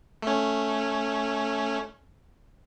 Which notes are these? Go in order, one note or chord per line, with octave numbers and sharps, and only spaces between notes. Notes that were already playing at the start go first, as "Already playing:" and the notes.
A3 C#4